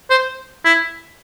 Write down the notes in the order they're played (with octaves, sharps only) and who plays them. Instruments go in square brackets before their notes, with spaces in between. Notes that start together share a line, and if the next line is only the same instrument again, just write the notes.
[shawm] C5
E4